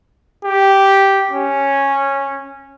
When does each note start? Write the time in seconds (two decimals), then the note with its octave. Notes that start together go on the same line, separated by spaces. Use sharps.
0.45 G4
1.31 C#4